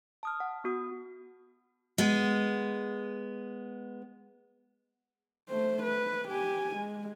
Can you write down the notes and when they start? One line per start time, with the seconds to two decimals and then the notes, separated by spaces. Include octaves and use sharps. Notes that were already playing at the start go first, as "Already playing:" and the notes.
0.23 A5 D#6 F6
0.40 F#5
0.64 B3 F#4 D#6
1.98 G#3 B3
5.49 A3 C5
5.83 B4
6.28 G4 G#5
6.76 G#3